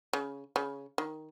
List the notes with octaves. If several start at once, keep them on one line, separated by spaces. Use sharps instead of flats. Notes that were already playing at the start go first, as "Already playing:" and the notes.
C#3
C#3
D#3